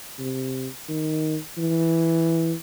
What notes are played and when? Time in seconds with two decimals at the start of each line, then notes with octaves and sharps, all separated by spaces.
0.19 C3
0.89 D#3
1.58 E3